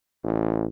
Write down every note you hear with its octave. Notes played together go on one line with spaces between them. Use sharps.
A1